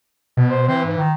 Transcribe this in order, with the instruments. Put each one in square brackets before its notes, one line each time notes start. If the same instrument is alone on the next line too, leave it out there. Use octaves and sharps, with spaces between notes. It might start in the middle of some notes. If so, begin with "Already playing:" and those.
[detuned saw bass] B2
[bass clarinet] C5
[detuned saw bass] E3 [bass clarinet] C4
[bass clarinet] G#2
D#3